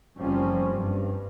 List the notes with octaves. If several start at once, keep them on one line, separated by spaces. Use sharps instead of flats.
F#1 F3 G3 C4 C#4
G2